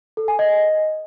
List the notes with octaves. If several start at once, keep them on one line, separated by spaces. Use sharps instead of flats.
A4
G#5
D#5